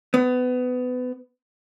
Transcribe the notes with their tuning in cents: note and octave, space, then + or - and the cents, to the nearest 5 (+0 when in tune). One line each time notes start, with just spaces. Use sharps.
B3 +25